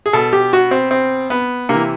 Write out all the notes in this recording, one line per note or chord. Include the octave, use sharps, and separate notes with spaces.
G#4
B2 A4
G4
F#4
C4
C4
B3
C3 E3 A#3